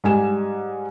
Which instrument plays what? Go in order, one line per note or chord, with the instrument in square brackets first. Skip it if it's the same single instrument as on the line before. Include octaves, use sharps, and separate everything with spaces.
[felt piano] G#2 G3 G#5 E7